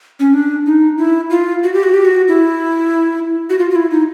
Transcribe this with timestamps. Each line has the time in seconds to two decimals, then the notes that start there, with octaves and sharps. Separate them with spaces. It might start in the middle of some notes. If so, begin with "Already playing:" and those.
0.20 C#4
0.34 D4
0.66 D#4
0.98 E4
1.30 F4
1.64 F#4
1.74 G4
1.83 F#4
1.94 G4
2.05 F#4
2.28 E4
3.50 F#4
3.59 F4
3.70 F4
3.76 E4
3.91 D#4